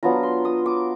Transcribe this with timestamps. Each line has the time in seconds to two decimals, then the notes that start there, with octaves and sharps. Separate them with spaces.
0.03 F#3 B3 D4 F4 A#5
0.23 C6
0.45 D#6
0.66 D6